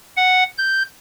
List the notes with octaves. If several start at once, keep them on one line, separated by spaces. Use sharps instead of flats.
F#5
G6